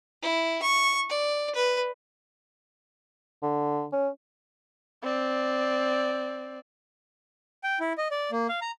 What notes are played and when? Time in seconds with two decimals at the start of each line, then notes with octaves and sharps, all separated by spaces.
0.22 E4
0.62 C#6
1.10 D5
1.55 B4
3.42 D3
3.93 C#4
5.03 C4 D5
7.64 G5
7.80 E4
7.98 D#5
8.11 D5
8.32 A#3
8.49 F5
8.62 A#5